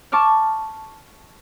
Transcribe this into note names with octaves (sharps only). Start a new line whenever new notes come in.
A5 C#6 D6 F6